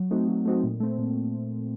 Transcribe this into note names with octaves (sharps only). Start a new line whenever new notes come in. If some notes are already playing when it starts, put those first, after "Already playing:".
Already playing: F#3
A3 C4 D#4 F#4
F#3
A3 C4 D#4 F#4
A#2
A3 C4
A#2